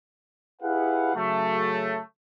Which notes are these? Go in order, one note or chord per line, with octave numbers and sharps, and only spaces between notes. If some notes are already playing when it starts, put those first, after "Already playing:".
E4 G4 G#4 B4 F5 F#5
C#3 F#3 A3